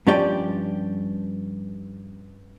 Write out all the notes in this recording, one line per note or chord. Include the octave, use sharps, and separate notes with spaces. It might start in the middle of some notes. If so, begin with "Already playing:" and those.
G2 F3 C#4 G4 D5 G5